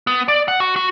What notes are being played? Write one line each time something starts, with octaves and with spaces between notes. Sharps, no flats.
B3
D5
F#5
F#4
F#4